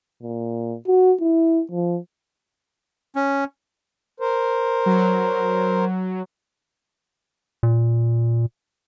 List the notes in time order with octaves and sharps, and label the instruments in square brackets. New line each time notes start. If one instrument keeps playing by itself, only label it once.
[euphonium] A#2
F#4
E4
F3
[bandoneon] C#4
[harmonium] A#4 C5
[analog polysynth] F#3
[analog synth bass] A#2